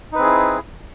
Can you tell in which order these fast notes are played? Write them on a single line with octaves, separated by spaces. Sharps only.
D#4 B4 C4 G#4 E4